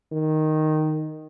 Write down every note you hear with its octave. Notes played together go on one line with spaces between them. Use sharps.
D#3